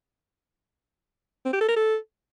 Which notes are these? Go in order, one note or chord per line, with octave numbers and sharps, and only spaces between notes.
C4
G4
A4
A#4
A4